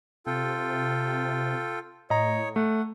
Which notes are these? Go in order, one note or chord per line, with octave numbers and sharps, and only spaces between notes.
C3 F4 A4 G5
A2 C#5 D#5 A#5
A3 F#5